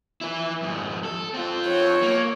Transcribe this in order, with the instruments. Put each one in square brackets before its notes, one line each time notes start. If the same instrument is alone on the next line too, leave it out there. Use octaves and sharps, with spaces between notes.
[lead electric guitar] E4 B4
F2 G#2
A4
C4 F4
[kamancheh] C#5
[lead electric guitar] A#3